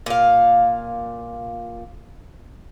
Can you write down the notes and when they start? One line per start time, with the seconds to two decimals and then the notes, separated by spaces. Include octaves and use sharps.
0.06 A#2 F5